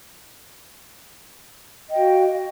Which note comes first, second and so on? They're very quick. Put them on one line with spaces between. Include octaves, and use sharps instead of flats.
D#5 G5 F#4 F5